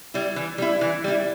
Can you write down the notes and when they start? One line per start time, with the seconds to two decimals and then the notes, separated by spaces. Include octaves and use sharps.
0.14 G3 E4
0.36 E3
0.58 G3 E4
0.81 E3
1.04 G3 E4